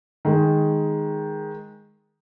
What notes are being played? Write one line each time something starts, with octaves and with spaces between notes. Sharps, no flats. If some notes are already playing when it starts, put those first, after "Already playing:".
D#3 G#3